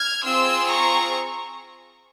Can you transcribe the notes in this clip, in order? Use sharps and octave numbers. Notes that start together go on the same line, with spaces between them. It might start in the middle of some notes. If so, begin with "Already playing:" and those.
Already playing: F6 G#6
C4 F4 G#4 C6 E6
A#5 C#6